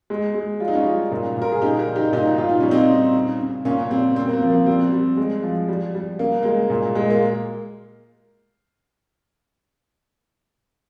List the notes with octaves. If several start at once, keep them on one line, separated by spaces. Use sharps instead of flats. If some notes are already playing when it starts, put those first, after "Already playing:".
G#3
G#3
G3 F4
D#4
C#4 F4
G3
A#2
A#2
A#4
G#4
C#3 D#4 G4
G4 A#4
G3
D#4 G4
A#2 D#4 G4
A#2 F4
D#4
G3 C#4
C4 D#4
C#3
C#3
C#3
A#2 A#3 C#4
G3 C4
C#3 C4
A#3
C4
F3
A#3
G3 C4
G3
G#3
F3
G3
G3
C#3 A#3
G#3 A#3
A#2
G#3
A#3